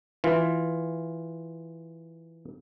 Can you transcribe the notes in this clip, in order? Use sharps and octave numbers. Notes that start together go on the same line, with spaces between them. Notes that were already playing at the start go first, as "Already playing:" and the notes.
E3 F4